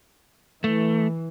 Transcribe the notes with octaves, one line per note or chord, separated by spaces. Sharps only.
E3 A3